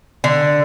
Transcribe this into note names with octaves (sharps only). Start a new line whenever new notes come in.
D3